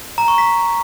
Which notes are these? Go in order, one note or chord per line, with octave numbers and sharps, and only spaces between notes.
A#5
C#6
B6